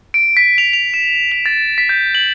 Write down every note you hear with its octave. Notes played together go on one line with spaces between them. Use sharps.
D7
B6
F7
F7
E7
F7
A6
B6
G6
F#7